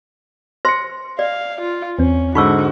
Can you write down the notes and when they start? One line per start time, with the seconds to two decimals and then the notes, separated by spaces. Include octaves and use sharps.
0.65 C5 C6 A#6 C#7
1.19 D5 F5
1.61 F4
1.99 E2 C4 C#4
2.35 G#2 D3 D#4 F#4 B5 C#6 E6